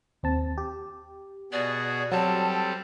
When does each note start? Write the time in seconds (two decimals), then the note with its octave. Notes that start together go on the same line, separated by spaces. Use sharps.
0.23 D#2 C4 A5
0.58 G4
1.52 B2 F#4 G#4 D5
2.12 F#3 G3 C4 A4 A5